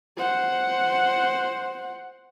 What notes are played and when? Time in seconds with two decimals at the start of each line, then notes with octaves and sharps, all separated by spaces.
0.17 C5 F#5